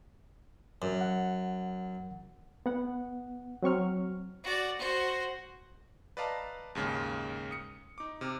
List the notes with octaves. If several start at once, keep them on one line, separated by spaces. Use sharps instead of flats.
F#2
F#5
B3 F#5
F#3 C4 C#6 F6
F#4 D5
F#4 C5
B4 D5 D#5 F5 A5 A#5
D#2 G#2 C#3 G#3
D#6 C#7
D#4 D6
C3 D6 F6